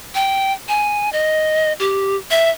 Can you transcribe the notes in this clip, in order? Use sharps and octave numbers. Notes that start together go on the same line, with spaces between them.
G5
G#5
D#5
G4
E5